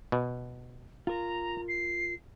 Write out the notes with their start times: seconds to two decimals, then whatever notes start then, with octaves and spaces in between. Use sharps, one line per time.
0.12 B2
1.07 F4 A#4 A#5
1.68 C7